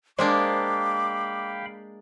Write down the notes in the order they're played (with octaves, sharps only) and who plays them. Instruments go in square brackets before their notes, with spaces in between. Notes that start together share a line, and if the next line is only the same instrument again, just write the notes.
[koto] G#3 A#3 D4 [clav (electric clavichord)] C5 [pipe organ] F5 G5 B5 [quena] D6